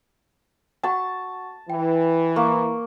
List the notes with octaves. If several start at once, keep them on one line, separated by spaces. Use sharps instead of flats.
F#4 F#5 A5 C#6
E3 G5
A#3 C#6